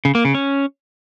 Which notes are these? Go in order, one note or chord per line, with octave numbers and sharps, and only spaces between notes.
C#3
A#3
C#3
C#4